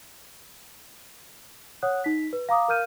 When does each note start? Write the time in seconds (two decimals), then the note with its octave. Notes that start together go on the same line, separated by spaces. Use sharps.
1.83 C#5 F#5 D#6 F#6
2.04 D#4 B6
2.33 B4
2.49 F5 A#5 D6 D#6
2.68 A#4 F5 F6 G6 D#7